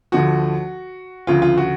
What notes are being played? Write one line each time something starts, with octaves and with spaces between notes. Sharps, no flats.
D2 D3 F3 F#4
D2 C#3 F3 F4
F4
F#4